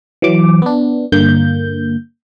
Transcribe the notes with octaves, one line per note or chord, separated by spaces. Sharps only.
E3 F#3 D6
B3 D4
G2 D3 A#3 G6